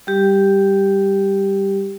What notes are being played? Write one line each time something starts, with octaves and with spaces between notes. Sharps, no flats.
G3 G4